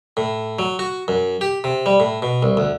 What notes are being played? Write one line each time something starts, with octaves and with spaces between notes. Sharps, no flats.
A2
F#3
F#4
F#2
G4
C3
G3
A2
B2
C2
D2